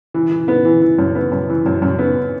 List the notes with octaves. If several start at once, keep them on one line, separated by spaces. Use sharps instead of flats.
E3
E3
B3
E3
E3
F#2
B3
F#2
E3
F#2
F#2
B3